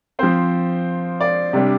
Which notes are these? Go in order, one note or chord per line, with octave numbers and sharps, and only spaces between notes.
F3 C4 C5
D5
C3 G3 D4